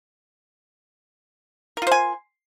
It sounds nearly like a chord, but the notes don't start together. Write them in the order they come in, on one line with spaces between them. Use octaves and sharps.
A#4 F4 C5 G#5